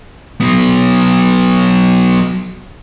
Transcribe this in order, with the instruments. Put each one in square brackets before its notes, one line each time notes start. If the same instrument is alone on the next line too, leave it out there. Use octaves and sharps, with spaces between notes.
[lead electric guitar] F#3 B3